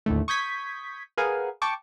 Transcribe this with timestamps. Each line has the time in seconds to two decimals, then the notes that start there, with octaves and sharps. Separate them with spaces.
0.06 D#2 A2 D3 A3
0.28 C#6 D#6 G6 G#6 B6
1.17 G#4 A#4 B4 F5 F#5 G#5
1.62 G5 A5 C#6 D6